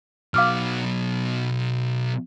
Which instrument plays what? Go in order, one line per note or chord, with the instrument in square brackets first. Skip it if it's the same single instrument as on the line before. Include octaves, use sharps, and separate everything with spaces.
[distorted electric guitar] B2 F#3 [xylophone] F5 D6 F6